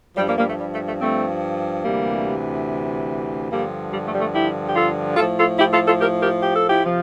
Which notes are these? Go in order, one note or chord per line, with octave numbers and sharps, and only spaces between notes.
G2 F3 G3
G3 A#3
G3 A#3
A3
G3
A3
A3
A3 C4
D2 C3 E3 G3 A#3
G2 D3 F3 G3 A#3
G3
A3
G3
A3
E4 G4
G4
F4 A4
A2 F3 F4 A4
F4 A4
E4 G4
F4 A4
F4 A4
G4 A#4
G4 A#4
G4
A4
E4 G4
C3 F3